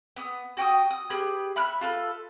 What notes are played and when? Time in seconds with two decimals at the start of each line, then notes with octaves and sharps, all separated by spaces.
0.16 B3 D#6
0.57 F#4 G5 D6 D#6
0.90 D#6
1.10 G4 G#4 B4 F6
1.56 E5 B5 F6 F#6
1.81 F4 A4 B4